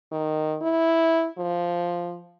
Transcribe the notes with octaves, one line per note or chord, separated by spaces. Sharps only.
D#3
E4
F3